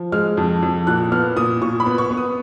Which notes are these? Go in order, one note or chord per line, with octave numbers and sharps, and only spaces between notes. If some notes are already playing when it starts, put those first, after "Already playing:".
Already playing: F3
G#3 F6
F2
F2
A#2 F#6
B3 F6
A#2 D#6
A#2 C#6
B5
B3
C#6
B3
D#6